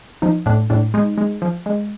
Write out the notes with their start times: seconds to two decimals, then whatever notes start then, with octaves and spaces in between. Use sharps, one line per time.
0.22 F3 D#4
0.46 A2 D4
0.70 A2 D4
0.94 G#3 D#4
1.18 G#3
1.42 F3
1.66 G#3